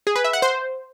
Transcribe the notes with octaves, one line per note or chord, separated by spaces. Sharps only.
G#4
B4
E5
F#5
C5